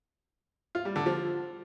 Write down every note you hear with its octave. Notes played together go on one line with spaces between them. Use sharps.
F4
G3
D3
F3